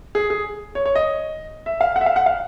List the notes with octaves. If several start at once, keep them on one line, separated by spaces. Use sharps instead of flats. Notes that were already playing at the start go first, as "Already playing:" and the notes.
G#4
G#4
C#5
C#5
D#5
E5
F5
F#5
E5
F5
F#5
F5